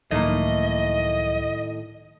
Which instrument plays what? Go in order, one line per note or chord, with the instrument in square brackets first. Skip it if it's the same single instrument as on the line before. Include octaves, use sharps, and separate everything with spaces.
[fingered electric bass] C#2 F3 F#3 [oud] A2 D#4 [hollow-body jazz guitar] D#3 A#3 [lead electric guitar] D#5